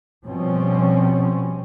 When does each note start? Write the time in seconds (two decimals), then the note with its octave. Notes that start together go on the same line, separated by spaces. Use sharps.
0.25 B2 F3 G3 C4 C#4